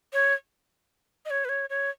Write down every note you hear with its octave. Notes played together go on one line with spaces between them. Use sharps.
C#5
D#5
C#5
B4
C#5
C#5